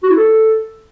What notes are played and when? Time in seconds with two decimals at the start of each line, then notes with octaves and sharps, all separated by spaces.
0.03 F#4
0.10 E4
0.17 A4